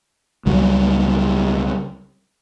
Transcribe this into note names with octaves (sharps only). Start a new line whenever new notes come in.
C#2 F#3 G3